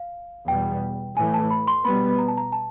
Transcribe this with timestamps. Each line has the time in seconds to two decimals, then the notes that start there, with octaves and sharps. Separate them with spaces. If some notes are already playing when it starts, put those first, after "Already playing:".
Already playing: F5
0.48 E2 B2 G3 G5
1.17 A2 E3 A3 G#5
1.34 A5
1.50 B5
1.67 C6
1.85 B2 G3 B3 B5
2.18 A#5
2.28 A5
2.37 A#5
2.52 A5